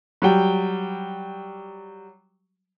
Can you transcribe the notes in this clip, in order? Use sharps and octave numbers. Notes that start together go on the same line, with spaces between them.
F#3 G3 G5